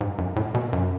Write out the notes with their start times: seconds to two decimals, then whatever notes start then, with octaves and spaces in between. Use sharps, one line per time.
0.01 G#2
0.18 F#2
0.36 A2
0.54 B2
0.73 F#2